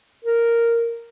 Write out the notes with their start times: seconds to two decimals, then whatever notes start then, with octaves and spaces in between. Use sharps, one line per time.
0.25 A#4